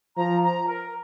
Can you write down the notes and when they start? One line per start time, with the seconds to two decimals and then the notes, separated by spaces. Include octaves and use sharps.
0.17 F3 A#5
0.42 A#5
0.67 A#4